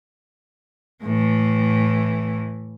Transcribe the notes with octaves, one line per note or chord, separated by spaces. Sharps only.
A2 E3